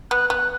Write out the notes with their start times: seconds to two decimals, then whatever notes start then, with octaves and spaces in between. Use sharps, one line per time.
0.11 B3 F#6
0.30 B3 F#6